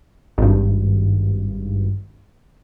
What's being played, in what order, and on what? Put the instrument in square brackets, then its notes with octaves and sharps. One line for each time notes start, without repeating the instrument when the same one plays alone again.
[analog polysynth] G#1 G2